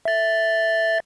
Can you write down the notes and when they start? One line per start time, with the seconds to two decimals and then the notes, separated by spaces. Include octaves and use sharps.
0.05 E5 A6